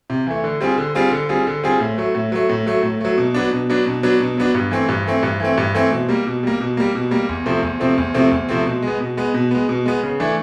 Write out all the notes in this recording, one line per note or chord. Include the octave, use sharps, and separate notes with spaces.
C3
E3 A3
D3
G3 C4 F4 G#4
D3
G3 C4 F4 G#4
D3
G3 C4 F4 G#4
D3
G3 C4 F4 G#4
A2
F#3 A3
A2
F#3 A3
A2
F#3 A3
A2
F#3 A3
B2
F#3 B3 D4
B2
F#3 B3 D4
B2
F#3 B3 D4
B2
F#3 B3 D4
G2
E3 A3 C4
G2
E3 A3 C4
G2
E3 A3 C4
G2
E3 A3 C4
B2
G3 A#3
B2
G3 A#3
B2
G3 A#3
B2
G3 A#3
E2
C3 F3 A3 C4
E2
C3 F3 A3 C4
E2
C3 F3 A3 C4
E2
C3 F3 A3 C4
B2
G#3 B3
B2
G#3 B3
B2
G#3 B3
B2
G#3 B3
C#3
E3 A3 D4